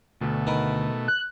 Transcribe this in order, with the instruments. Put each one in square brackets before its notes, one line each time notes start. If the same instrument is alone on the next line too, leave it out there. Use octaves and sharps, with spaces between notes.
[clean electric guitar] D2 [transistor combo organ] B2 A3
[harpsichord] D#3 A#4 B4
[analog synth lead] F#6